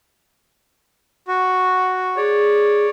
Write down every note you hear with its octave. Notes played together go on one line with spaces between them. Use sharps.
F#4
G#4 C#5 D5